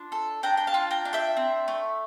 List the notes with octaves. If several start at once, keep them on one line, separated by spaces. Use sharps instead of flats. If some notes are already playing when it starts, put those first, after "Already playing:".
Already playing: D4 F4 C6
A4
D4 G5 A#5
G5
F5 A5
F4
G5 A#5
D4
E5 G5
C4
A3